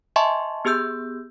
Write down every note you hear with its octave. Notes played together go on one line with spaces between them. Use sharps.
D#5 E5 G#5 A5 C6 C#6
B3 G4 G#4 E6 G6